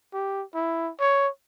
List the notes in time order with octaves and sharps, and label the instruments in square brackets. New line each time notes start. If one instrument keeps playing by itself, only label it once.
[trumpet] G4
E4
C#5